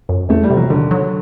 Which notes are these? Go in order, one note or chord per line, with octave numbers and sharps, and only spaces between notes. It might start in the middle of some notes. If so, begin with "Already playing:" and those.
F#2
E2 A3
G3
C3
F#3
D3 D#3
F#3